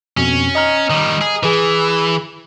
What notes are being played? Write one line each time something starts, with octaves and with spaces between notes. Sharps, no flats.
F2 B2 C#4
D#5 A#5 F6
D#3 G3
G#4
E3 G#4 B4